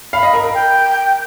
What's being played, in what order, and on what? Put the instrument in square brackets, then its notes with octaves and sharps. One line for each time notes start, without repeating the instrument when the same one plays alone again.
[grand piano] F5 [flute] B5
[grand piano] D#5
A#4
A#4
[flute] G5